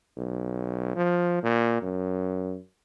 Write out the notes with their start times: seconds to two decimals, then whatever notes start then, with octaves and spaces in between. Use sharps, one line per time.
0.17 B1
0.96 F3
1.43 A#2
1.82 F#2